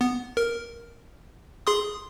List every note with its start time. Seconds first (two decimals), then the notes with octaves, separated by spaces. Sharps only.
0.01 B3
0.37 A#4
1.67 G#4 C6 D#6